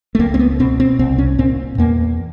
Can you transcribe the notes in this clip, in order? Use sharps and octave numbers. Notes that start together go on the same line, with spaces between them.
A3
C#2 A#3
C4
B3
B2 C4
C4
C2 C4
C#4
A#2 C4
E2 A#3